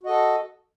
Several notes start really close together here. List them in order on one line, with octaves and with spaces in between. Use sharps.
F#4 D#5 A4